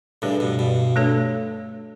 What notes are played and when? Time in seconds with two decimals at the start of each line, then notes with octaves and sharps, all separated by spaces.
0.22 A2 C#3 G3 D4 G4 B4 D5
0.40 G2 B2
0.59 G2 B2
0.96 A3 D4 A4 C#5